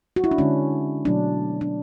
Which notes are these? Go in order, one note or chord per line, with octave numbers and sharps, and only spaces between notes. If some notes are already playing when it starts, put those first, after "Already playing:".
F#4
E4
D4
D3 G#3 C#4
B2 F#3 A3 D4
D4